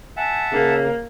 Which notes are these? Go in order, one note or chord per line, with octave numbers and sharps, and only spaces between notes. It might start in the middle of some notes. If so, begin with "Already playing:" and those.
E5 F#5 G#5 A5
C#3 A#3